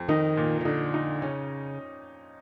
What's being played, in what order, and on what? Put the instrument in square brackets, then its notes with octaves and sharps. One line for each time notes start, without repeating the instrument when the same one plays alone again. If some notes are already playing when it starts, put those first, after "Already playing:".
Already playing: [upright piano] F2
[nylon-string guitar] D#3 [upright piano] D#4
[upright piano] A#2
[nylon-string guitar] D#3
[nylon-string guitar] D3 [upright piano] D#4
[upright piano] D#4
[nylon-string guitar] C#3 [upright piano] C#4